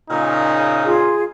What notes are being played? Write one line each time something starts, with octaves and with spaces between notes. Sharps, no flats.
A#2 C#3 D#4
F4 G#4